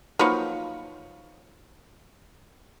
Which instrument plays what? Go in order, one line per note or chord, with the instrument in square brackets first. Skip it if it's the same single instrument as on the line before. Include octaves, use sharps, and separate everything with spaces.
[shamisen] F3 F#3 A#3 [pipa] D#4 B4 C#5